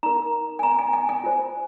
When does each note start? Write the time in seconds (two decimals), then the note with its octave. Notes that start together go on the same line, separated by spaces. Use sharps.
0.03 D#4 A#4 A#5
0.59 G#5
0.63 A#5
0.79 G#5
0.93 G#5
1.09 G#5
1.24 F4 C5